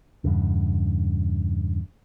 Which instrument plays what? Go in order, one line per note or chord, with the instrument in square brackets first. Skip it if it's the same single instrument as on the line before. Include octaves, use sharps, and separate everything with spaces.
[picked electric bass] E2 G2 C#3